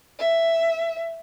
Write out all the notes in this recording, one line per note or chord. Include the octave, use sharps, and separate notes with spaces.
E5